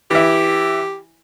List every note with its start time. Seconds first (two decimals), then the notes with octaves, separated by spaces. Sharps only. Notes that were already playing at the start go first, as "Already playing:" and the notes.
0.11 E3 E4 G4